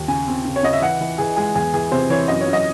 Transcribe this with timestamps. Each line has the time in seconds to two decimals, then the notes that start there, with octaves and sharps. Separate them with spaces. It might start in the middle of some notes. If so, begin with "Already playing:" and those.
Already playing: D#2
0.08 C#3 G#5
0.28 C4
0.45 C#3
0.56 C#5
0.63 C#3 D#5
0.73 E5
0.82 E3 F#5
1.01 E3
1.18 E3 G#4
1.36 G#3 G#4
1.55 E2 G#4
1.74 E3 G#4
1.92 C3 C5
2.10 E3 C#5
2.28 F#2 D#5
2.41 C#5
2.47 F#2
2.53 D#5